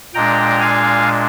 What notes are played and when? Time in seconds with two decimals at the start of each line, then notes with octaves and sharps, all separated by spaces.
0.14 A#2 G#3 D4 G5 A#5
0.60 F5 G#5